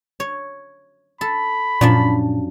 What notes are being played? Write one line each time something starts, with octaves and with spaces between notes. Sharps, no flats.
C#5
A4 B5
F#2 A#2 F3 D4